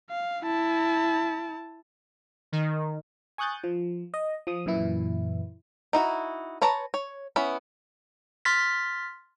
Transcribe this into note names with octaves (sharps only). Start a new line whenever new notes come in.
F5
E4 A5
D#3
G#5 C#6 D#6 F#6 G6 A6
F3
D#5
F3 D#6
F#2 A#2 E3 E4
D#4 E4 F#4
B4 C#5 A5 A#5
C#5
B3 C#4 E4 B5
C6 F6 A6 B6